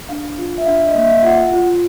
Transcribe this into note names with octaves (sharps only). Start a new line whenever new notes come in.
D4 F5
F4
E5
D4 F5
D#5
A#3 E5
F5
F4 F#5
F4